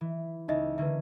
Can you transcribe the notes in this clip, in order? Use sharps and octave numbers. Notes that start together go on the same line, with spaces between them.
E3
C#2 D#4 D#5 E5
D3 A#3 C#4 B4 E5